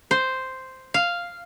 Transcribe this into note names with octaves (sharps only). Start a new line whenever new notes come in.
C5
F5